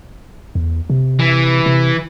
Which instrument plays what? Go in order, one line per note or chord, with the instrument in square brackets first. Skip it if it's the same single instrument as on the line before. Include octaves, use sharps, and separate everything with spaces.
[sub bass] E2
C3
[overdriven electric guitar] E3
[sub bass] C3